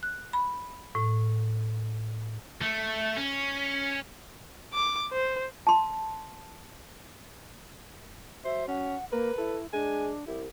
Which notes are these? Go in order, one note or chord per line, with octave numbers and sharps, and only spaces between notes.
F#6
B5
A2
A3
C#4
D6
C5
A5 C6
F#3 C5 E5
C#4 F#5
A#3 A#4 B4
E4 A4
G#3 D4 G#5
C2 E4 G4